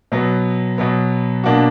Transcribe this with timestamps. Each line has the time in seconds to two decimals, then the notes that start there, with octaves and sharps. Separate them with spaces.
0.12 B2 F#3 B3
0.78 B2 F#3 B3
1.44 B2 A#3 D4 F#4